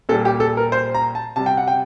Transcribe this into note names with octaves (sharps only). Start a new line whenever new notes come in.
A#2 G3 A4
G4
A4
A#4
C5
A#5
A5
C3 G3 A5
G5
F#5
G5